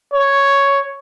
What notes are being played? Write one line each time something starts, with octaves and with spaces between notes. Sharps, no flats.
C#5